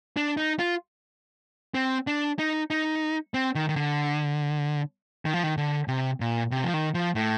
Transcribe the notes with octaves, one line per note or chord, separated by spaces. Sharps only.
D4
D#4
F4
C4
D4
D#4
D#4
C4
D#3
D#3
D3
D#3
F3
D#3
D3
C3
A#2
C3
F3
D#3
F3
A2